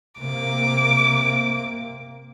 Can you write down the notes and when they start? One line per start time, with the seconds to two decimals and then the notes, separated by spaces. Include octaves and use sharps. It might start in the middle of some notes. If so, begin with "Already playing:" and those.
0.21 C3 A#3 D6